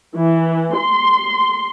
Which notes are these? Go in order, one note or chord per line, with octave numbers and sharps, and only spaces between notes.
E3
C6